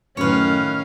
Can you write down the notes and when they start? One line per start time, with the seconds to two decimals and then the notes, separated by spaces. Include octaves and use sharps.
0.17 F#2 A2 D#3 A3 C#4 B4 C#5 F5